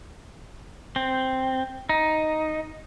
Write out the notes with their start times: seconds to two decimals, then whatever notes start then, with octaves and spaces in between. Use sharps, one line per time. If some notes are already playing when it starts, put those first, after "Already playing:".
0.96 C4
1.89 D#4